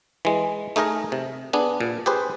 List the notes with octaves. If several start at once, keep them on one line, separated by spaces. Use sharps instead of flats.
E3 G#3
A3 D#4 G#4 A#4 D#5
C3
B3 D4 G#4
A#2
G4 G#4 B4 C5